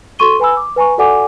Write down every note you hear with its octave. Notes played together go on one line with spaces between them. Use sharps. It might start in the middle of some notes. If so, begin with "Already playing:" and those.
F#4 A4 C6 C#6 D#7 G7
B4 G#5 B5 E6
D6
B4 G#5 A#5 C#6
F#4 A4 D5 F#5 G#5 D6